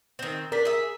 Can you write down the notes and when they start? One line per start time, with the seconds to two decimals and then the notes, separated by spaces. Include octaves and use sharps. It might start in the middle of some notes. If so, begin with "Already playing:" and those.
0.19 D#3 C4
0.52 D4 A#4 B6
0.65 G#4 E5